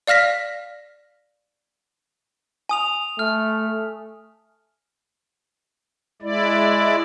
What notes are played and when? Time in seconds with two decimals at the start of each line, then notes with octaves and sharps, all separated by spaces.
0.07 D5 F5 F6 A#6 B6
2.69 G#5 D#6 F7
3.19 A3 F6
6.22 G#3 E4 D5